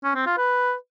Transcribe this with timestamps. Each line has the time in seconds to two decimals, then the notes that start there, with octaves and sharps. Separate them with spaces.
0.04 C#4
0.15 C4
0.26 F4
0.37 B4